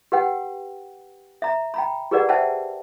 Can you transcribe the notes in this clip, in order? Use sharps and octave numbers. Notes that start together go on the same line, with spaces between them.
G4 B4 F#5 G5
E5 A#5
G5 A#5 B5
G4 G#4 A#4 B4 D5 F#5
C5 E5 F#5 G5 A5